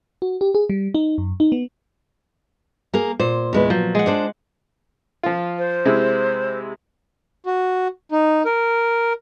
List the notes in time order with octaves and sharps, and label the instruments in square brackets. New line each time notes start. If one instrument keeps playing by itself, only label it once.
[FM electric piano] F#4
G4
G#4
G3
D#4
F#2
D#4
B3
[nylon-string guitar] A#3 G#4 A#4
[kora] A#2 [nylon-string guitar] C5
[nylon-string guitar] E2 G#3 B4
[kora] F3 [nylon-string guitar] F#3
[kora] G#3 F#5
[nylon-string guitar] D4 C5 D5
[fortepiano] F3 F4
[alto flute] C5
[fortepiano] C3 G#3 E4
[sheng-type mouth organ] F#4
D#4
A#4